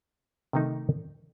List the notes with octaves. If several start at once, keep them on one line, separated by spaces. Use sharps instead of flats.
C3 D#3 A3 D#4